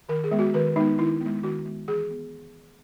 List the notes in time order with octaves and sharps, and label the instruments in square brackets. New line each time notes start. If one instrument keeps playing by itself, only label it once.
[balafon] D#3 A#4
G#4
G#3 B3
F#4
D#3 B4
G#3 B3 D#4
D#3 E4
B3
G#3
D#3 F#4
G#3 B3
E3 G#4
B3